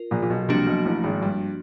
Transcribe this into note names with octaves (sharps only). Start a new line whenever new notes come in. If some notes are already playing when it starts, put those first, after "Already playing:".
Already playing: F4 A#4
A#1 A#2
A#2
B1 B2
C2 C3 F3 A#3 D4 F#4
B1 B2
A1 A2
G#1 G#2
G2